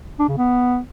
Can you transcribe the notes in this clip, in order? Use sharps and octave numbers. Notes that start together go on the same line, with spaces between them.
D4
C#3
B3